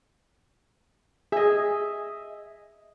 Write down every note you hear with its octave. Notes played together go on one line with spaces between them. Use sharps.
G#4 D#5 E5